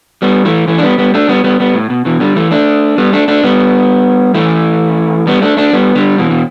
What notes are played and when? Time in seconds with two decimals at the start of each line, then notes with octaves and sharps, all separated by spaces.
0.22 G3 B3
0.45 E3 A3
0.68 E3 A3
0.78 D4
0.83 G3 B3
0.98 G3 B3
1.14 A3 D4
1.29 G3 B3
1.44 G3 B3
1.60 G3 B3
1.74 A2
1.90 B2
2.05 B2 E3
2.20 D3 G3
2.36 E3 A3
2.51 A3 D4
2.98 G3 B3
3.13 A3 D4
3.28 A3 D4
3.44 G3 B3
4.34 E3 A3
5.27 G3 B3
5.42 A3 D4
5.57 A3 D4
5.73 G3 B3
5.96 D3 G3
6.18 B2 E3
6.31 B2